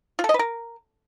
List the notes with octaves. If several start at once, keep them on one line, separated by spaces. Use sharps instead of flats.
F4
A4
D#5
B4
A#4